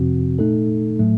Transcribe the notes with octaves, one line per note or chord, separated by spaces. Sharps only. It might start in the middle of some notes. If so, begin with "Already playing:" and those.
Already playing: F2 C3 F3 C4 F#4
A#2 A3 D#4 A4
A2 F#3 A3